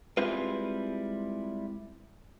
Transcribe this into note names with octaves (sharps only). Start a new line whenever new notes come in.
G3 G#3 C4 E4 F4 B4